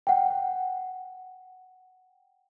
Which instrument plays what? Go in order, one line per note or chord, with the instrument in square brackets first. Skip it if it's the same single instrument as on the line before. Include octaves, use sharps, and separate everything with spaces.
[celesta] F#5 G5